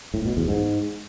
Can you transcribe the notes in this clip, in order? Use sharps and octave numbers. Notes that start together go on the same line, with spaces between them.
A2
B2
E2
G#2